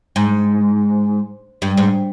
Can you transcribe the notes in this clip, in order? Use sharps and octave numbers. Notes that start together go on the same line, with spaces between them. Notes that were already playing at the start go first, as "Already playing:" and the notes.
G#2
G2
G#2